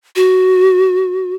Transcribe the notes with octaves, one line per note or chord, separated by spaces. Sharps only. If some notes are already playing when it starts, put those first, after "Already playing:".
F#4